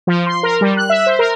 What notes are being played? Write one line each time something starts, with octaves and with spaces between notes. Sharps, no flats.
F3
C6
A#4
G3
F#6
E5
C5
A#4